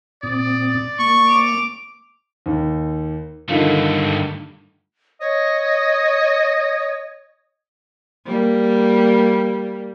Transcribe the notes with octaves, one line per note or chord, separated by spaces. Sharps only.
A#2 C4 D5 D#6
A#3 C#6
D6 F7
D#2
G2 D3 D#3 A3 F4
C#5 D#5
G3 A#3